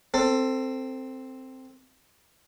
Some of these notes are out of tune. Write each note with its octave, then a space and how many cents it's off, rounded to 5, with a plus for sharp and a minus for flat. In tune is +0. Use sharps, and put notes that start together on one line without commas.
C4 +0 A4 +20